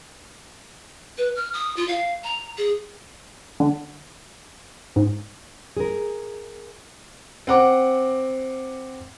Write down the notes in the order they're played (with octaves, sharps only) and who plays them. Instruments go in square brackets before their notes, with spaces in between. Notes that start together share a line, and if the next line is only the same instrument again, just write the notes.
[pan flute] B4
F6
D#6
F4
F5
A#5
G#4
[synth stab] D3
G#2
[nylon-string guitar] G#4 A#4
[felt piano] C4 F#5 D6